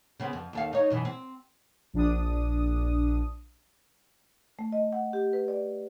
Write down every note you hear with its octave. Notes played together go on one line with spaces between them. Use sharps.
C#3 B3 C4
F2
D#2 A4 F5
D#4 C#5
F#2 B2 E3
C4
A#1 D4 D#6
A3
D#5
F#5
G4
B4
D5